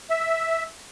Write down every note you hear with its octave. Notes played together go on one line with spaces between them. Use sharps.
E5